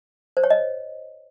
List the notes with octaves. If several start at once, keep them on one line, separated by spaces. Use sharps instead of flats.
C5
C#5
D#5